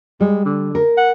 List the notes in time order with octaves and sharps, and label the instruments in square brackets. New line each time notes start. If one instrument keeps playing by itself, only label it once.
[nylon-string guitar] G3 [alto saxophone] G#3
[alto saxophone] D3
[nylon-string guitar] A#4
[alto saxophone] F#5